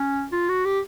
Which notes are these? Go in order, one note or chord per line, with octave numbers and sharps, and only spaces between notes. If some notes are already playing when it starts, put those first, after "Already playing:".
Already playing: C#4
F4
F#4
G4